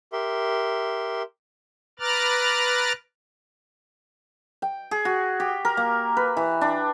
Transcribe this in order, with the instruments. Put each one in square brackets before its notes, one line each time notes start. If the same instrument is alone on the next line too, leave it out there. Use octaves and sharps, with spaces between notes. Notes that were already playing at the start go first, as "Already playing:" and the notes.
[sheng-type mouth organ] G4 A#4 E5 C6
[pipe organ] B4 A#5 D6 F6 F#6 A6
[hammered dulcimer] G5
G#4
F#4
G4
A#4
A#3
B4
E3
D4